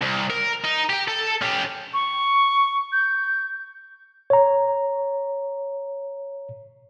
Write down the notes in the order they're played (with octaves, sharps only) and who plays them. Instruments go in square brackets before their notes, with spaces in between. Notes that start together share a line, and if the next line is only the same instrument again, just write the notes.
[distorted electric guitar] C2
A#4
D#4
G4 G5
A4
C#4 G4
[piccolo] C#6
G6
[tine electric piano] C#5 A#5